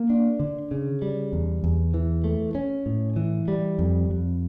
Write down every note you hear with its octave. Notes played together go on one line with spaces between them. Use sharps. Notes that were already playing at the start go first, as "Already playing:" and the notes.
Already playing: A#3
D4
D3
C#3
G3
E2
E2
E3
A3
C#4
A2
E3
G3
F2
F2